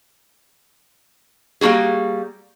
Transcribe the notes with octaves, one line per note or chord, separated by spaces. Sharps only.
G3 A#3 E4 F#4 G#4